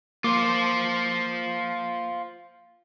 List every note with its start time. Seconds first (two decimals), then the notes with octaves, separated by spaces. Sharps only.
0.24 A#3 F4 C5 D6